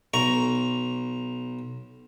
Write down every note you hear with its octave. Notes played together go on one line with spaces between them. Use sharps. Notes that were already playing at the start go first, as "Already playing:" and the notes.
B1 A#5 C#6